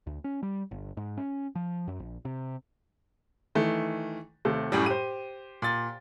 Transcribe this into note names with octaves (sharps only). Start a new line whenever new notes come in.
D2
C#4
G3
G1
G#2
C#4
F3
F#2
A#1
C3
D#3 E3 A3
D#2 C3 A3
F#2 A2 G3
G4 C5 D#7
A#2 A6